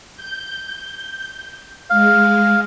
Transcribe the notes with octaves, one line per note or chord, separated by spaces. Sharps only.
G6
G#3 F5